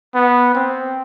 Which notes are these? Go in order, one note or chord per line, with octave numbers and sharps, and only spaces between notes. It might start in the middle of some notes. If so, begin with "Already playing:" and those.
B3
C4